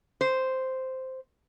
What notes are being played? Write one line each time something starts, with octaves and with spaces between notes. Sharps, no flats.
C5